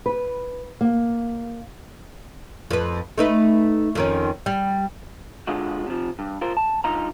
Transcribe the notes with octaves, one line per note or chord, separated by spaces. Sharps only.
B4
A#3
F2 B4
A3 D#4 B4
F2 D#3 C#4
G3
D3 G#3 F4 F#4
C3 F3
G2
F4 A#4 C5
A5
G2 D#4 F4 A#5